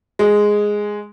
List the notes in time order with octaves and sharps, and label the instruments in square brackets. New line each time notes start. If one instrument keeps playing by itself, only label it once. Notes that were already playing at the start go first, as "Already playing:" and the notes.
[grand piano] G#3